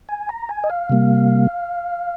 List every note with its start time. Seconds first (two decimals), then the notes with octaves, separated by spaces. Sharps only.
0.09 G#5
0.29 A#5
0.49 G#5
0.64 D#5
0.70 F5
0.90 C3 G3 A#3